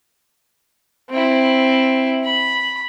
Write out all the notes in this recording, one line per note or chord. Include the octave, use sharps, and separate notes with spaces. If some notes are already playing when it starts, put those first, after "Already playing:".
C4 E4
B5